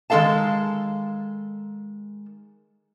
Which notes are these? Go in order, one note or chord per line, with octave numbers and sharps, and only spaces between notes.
D#3 G#3 C4 A4 F5 A5